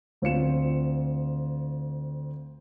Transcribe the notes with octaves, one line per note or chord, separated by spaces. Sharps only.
D2 C4 F4 C#7 E7